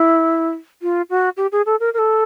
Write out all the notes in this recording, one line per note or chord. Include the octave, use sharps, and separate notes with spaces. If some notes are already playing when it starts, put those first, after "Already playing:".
Already playing: E4
F4
F#4
G4
G#4
A4
A#4
A#4
A4